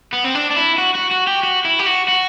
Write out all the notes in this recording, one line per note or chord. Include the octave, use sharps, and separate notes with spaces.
B3
C4
D4
D4
E4
F#4
F#4
F#4
G4
F#4
E4
G4
F#4
F#4